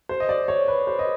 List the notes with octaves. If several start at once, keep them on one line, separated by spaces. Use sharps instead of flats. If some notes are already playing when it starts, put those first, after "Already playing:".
C5
D#5
D5
C#5
B4
C5
D#5